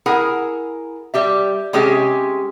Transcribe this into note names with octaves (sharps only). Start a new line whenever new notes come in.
E4 G#4 A#4 F#5
G3 G4 E5
C3 G#3 C#4 G4